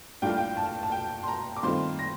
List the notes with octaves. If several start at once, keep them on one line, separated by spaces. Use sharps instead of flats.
A2 G3 A#3 D4 F4 G5
F5
G5
A5
A5
G5
C6
A#5
D6
G2 D#3 A3 C4 F4 C6
A#6